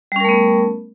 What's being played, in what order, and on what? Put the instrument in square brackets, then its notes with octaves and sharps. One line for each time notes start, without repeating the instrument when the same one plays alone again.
[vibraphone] G3
C#4
A#4
A3
B3